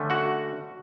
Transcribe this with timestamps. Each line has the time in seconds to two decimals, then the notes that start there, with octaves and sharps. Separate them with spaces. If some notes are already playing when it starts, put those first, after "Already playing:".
Already playing: D3 A3 C#4
0.10 F#4 F#5